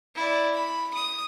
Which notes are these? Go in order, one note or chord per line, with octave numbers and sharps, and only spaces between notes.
E4 D5
B5
D#6